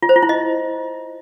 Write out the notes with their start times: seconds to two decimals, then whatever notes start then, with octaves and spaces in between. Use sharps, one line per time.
0.02 F4
0.09 C5
0.16 F4
0.23 E4
0.29 D#5